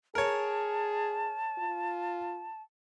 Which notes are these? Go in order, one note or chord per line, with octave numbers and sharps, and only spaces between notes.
G#4 A#4 C#5 A5
F4